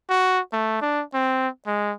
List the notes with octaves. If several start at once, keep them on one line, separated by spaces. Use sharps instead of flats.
F#4
A3
D4
C4
G#3